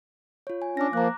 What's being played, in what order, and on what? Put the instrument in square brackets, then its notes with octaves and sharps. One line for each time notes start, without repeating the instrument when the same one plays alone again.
[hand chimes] F4 C#5
G#5
[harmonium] C#4 D4 [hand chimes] D6 A#6
[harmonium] F3 A#3 [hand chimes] A#5 F#6